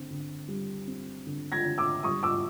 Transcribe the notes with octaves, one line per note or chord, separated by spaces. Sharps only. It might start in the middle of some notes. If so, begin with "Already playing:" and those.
Already playing: D3 C4
D3
G3
C4
D3
G#6 A#6
D3
D6 E6
G3 C#6 D#6
D6 E6